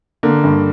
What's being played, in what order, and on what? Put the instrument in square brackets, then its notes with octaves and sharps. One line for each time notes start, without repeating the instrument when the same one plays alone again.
[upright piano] D3 A#3
G2